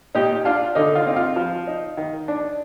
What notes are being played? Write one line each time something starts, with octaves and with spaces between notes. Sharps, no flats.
A#2 D#4 G4
D4 F4
D3 D#4
F4
C4 D#4
F4
F3
D#4
D#3
D4